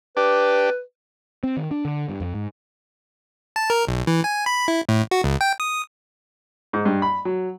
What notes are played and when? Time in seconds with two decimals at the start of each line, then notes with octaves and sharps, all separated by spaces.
0.17 D4 G4 B4
1.43 C4
1.57 D#3
1.71 D4
1.85 D3
2.09 G2
2.20 F2
2.35 G#2
3.56 A5
3.70 A#4
3.87 B1
4.07 E3
4.24 G#5
4.46 B5
4.68 E4
4.89 A2
5.11 F#4
5.24 C#2
5.41 G5
5.60 D#6
6.73 G#2
6.85 G2
7.02 B5
7.25 F#3